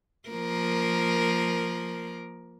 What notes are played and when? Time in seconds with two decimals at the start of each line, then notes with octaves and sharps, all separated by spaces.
0.29 F3 A#3 A#4